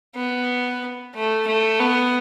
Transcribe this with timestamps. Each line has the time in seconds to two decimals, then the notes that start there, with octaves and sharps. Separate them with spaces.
0.15 B3
1.14 A3
1.47 A3
1.80 B3